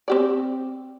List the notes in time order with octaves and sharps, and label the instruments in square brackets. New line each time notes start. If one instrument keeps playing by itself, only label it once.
[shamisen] C4 G4 D5